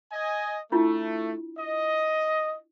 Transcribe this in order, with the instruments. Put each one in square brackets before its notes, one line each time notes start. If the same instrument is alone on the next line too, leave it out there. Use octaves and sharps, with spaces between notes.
[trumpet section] D#5 G#5
[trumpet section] A3 [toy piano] D4 E4 F4
[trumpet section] D#5